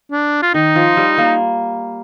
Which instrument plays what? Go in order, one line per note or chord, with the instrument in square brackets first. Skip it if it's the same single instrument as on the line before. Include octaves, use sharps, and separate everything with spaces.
[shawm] D4
F4
[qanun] D#3 [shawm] D#4
[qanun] F3
G3
A#3